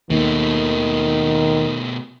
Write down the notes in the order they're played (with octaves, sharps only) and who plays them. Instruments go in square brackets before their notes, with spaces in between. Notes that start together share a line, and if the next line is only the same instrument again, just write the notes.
[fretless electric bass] D#2 [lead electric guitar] B2 A3 [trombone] D#3